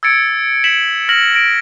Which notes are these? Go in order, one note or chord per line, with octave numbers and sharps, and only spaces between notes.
E6 G#6 A6 C#7 D7
B6 E7 F#7
F6 A#6 F#7
A#6 D7